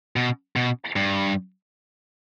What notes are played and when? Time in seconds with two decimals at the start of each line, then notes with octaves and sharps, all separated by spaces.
0.16 B2
0.56 B2
0.96 G2